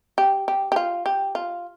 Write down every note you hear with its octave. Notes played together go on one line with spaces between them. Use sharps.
G4
G4
G4
F4
G4
F4